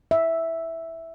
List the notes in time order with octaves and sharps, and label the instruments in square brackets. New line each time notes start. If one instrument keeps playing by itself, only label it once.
[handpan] E5